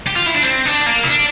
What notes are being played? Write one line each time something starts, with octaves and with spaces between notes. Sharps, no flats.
G4
F4
E4
D4
C4
D4
A#3
E4
D4